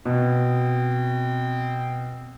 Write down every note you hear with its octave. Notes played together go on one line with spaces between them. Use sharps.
B2 C4